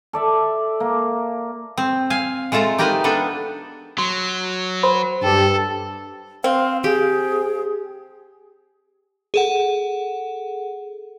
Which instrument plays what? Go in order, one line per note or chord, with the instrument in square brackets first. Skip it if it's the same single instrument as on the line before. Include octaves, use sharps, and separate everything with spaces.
[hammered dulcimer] A4 D5 E5
A#3
[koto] C4
F5 G#5
G#3 A3 F4 A4 A#5
D#4 G4 A#4 B4 G#5
B3 D4 A4
[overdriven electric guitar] F#3 [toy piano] C6
[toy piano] C5 B5 C6
[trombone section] G2 G4 [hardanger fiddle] A4
[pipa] C4 [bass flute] F5
[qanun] G4 [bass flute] G#4
[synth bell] G#4 A4 F#5